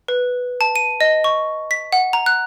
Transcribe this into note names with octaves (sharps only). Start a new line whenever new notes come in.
B4
A5
D#7
D#5
C#6
B6
F#5
A#5
F#6